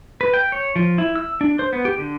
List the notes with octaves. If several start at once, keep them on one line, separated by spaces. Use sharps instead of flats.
B4
G5
C#5
F3
E4
E6
D4
C5
B3
G4
D3